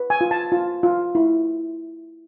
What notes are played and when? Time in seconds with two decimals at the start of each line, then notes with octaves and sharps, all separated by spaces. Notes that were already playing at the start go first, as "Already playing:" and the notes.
Already playing: B4
0.10 G#5
0.21 F4
0.31 A5
0.52 F4
0.83 F4
1.15 E4